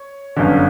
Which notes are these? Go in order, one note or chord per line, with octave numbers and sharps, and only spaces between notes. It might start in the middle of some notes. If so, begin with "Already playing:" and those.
Already playing: C#5
G1 F#2 D3